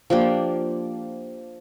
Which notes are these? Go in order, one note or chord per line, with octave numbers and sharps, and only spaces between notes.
F3 A#3 D4 G4